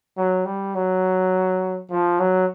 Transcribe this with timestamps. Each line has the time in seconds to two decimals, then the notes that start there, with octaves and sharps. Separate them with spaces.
0.17 F#3
0.45 G3
0.75 F#3
1.90 F3
2.19 F#3